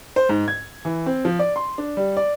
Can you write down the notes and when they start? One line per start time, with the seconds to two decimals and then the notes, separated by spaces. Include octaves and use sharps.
0.16 C5
0.29 G#2
0.48 G#6
0.85 E3
1.06 C4
1.25 F3
1.39 D5
1.56 C6
1.78 D4
1.97 G3
2.17 D5